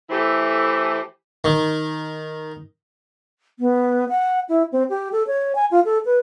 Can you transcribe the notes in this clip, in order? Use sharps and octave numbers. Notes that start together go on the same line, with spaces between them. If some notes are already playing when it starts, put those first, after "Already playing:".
E3 A3 E4 G4 A4 C5
D#3
B3
F#5
E4
C4
G4
A4
C#5
G#5
F4
A4
B4